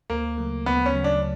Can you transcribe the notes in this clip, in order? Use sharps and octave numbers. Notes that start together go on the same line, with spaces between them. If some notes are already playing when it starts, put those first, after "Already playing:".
D2 A#3
C#3 F#3 A3
D2 B3
C#4
C#3 F#3 A3
D4